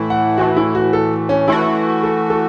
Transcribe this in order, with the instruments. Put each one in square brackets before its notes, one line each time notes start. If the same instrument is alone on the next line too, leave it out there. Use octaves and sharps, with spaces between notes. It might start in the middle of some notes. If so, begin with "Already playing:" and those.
Already playing: [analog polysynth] A2 E3 A3 E4
[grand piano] F#5
[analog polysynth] A2 E3 A3 [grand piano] F#4
[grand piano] E4
F#4
A4
C#4
[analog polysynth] E3 A3 F#4 [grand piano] E4
[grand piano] A4
A4